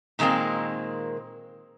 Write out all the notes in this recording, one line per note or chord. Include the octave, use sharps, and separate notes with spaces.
A#2 D#3 G#3 A#3 C4